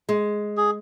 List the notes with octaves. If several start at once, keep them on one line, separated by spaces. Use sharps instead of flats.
G#3
G#4